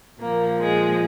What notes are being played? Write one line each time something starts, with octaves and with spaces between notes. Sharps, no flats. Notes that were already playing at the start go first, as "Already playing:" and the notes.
A#2 F3 A#3
G#3